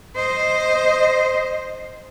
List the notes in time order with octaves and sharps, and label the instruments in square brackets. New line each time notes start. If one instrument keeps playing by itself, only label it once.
[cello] C5 D#5